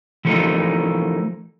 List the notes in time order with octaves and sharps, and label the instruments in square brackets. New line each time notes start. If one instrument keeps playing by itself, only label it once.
[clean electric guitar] E3 F3 G3 A3 A#3 D#4